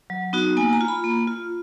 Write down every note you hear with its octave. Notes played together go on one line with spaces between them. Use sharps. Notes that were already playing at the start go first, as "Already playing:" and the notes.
F#3
B3 D#4 F#4
A#3 G#5
A#5
F4
B5
A#3
F4